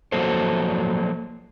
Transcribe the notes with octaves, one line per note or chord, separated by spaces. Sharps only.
F3 F#3 A#3 F#4 A4 C5